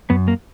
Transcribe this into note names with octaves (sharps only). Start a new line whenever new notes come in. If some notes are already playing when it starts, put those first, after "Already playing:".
F#2 B3
A#3